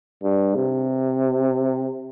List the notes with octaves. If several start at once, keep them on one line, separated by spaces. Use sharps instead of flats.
G2
C3